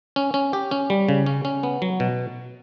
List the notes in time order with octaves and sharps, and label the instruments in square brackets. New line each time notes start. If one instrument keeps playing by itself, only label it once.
[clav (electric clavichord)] C#4
C#4
G4
C#4
G3
C#3
C#4
C#4
B3
F#3
B2